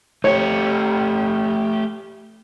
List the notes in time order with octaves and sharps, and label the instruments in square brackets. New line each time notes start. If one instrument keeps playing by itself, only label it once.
[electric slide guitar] A3 G4 [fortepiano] C#5